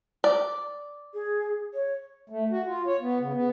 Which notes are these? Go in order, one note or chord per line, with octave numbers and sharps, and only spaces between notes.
D5
G#4
C#5
A3
F#4
F4
C#5
B3
C#3
B3